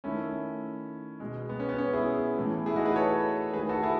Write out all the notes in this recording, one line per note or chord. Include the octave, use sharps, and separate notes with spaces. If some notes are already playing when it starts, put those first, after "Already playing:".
D#3 A3 C#4 E4
B2 G#3
B3
C#4
B3
C#4
E4 G#4
A2 E3 A3
E4 G#4
D#4 F#4
G#4 B4
A4 C#5
D#3 A3 G#4 B4
F#4 A4
E4 G#4